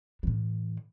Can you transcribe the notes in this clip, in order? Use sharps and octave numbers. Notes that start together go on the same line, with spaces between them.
A2 E3